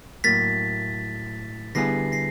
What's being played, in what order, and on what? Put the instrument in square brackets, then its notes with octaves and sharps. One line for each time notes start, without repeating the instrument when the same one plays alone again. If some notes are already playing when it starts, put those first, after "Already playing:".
[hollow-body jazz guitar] A2 F#3 A#3 [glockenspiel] A6 B6
[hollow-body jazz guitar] D3 G3 B3 E4 G#4 [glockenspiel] A#6 C7
[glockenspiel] A#6 C7